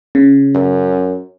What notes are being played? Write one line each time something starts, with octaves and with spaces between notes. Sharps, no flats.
C#3
F#2